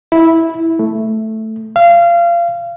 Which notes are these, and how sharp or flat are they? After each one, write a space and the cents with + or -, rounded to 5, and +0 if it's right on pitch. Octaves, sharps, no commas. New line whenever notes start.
E4 -10
A3 +0
F5 -25